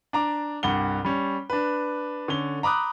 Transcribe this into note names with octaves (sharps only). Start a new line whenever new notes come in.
D4 A#5 D6
C2 G2 F#5 G7
G3 C#4
D4 B4
D3 C#4 G7
A#5 B5 D6 D#6 F#6